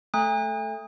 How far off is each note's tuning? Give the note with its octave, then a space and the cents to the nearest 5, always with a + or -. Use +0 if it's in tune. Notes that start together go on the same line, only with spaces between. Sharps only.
A3 +0 G#5 -45